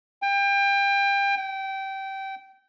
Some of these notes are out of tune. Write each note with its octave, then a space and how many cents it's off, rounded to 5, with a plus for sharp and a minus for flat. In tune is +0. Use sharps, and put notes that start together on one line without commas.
G5 +30
G5 -20